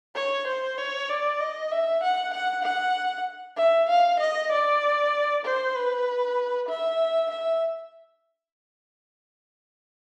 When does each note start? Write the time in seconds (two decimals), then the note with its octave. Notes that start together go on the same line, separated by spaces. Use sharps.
0.15 C#5
0.47 C5
0.78 C#5
1.09 D5
1.40 D#5
1.71 E5
2.03 F#5
2.34 F#5
2.65 F#5
3.58 E5
3.89 F5
4.20 D#5
4.52 D5
5.45 C5
5.76 B4
6.69 E5
7.31 E5